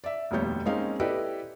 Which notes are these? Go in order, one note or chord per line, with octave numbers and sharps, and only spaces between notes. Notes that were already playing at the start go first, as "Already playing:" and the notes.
D5 E5
F1 D#2 B2 G3 C#5 G6
G#3 A#3 C4 C#4 D#4 F5
E4 G4 A4 B4 D5 D#5